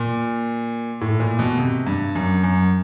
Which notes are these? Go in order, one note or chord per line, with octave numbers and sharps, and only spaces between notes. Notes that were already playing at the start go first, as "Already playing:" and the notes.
Already playing: A#2
A2
A#2
B2
C3
G2
F#2
F#2